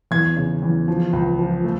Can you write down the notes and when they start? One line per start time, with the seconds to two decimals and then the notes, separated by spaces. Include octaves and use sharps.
0.11 E2 G#6
0.37 C#3
0.63 E2
0.88 F3
1.13 C#2
1.39 F3
1.64 A3